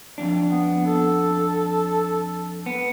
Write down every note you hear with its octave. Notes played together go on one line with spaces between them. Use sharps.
F2 G#2 D4
B3
A4
B3